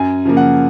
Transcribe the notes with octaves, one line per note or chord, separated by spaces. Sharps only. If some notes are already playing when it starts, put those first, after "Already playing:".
Already playing: F#2 G#5
C#3 F3 A#3
F#5